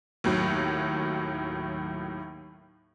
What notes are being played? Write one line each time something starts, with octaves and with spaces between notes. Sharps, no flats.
D#2 A2 F#3